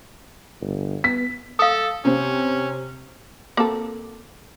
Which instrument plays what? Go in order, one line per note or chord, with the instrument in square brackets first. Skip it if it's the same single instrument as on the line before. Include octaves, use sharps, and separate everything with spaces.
[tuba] G1
[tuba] B3 [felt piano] B6
[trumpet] A4 [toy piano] F5 D#6
[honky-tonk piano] C3 C4 [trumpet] C#4
[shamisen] A#3 C4 A4